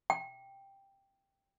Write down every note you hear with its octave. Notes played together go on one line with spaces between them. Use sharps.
G5